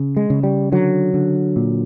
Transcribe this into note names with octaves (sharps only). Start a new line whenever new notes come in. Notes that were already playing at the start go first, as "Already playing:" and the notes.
Already playing: C#3
G#3
C#3
G3
D3 F#3
D3
A#2